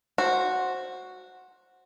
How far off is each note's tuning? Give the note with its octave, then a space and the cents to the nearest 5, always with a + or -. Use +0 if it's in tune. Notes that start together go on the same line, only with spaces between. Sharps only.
F#4 -5 C5 +15